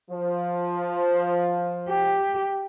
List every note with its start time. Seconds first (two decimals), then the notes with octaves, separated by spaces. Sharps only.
0.11 F3
1.89 G4